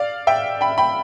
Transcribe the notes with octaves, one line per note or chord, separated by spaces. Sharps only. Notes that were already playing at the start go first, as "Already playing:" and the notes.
Already playing: D5 F5
E5 G5
G5 B5
G5 B5